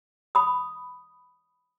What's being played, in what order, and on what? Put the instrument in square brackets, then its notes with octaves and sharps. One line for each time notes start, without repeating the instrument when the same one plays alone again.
[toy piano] B5 D#6